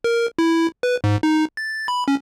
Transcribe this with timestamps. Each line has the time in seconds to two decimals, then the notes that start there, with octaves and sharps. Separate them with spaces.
0.04 A#4
0.39 E4
0.83 B4
1.04 G#2
1.23 D#4
1.57 A6
1.88 B5
2.08 C#4